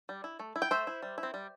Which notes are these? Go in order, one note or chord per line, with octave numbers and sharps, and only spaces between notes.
G3
E4
A3
E4
G5
A3 C5 E5
E4
G3
E4
C4
G3